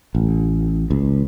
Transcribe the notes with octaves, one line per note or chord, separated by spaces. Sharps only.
A1
C#2